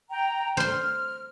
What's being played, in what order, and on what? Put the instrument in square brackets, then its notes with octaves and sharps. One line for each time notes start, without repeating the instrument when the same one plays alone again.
[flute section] G5 A#5
[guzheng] C5 C6 [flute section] F6